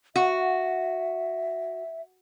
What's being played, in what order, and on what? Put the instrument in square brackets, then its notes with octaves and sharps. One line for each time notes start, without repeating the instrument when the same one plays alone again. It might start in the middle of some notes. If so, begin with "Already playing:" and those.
[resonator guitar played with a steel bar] F#4 [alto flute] E5